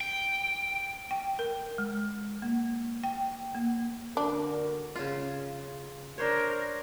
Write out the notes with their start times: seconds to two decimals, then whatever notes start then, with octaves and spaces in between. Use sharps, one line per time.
0.01 G5
1.11 G5
1.39 A#4
1.78 G#3
2.42 A#3
3.04 G5
3.55 A#3
4.17 D3 D4 F#4 A#4
4.95 C#3 F4
6.18 D4 A#4 C5 C#5